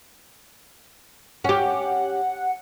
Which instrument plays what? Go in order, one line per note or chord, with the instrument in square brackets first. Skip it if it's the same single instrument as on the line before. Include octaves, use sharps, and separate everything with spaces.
[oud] C#4 G4 [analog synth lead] F#5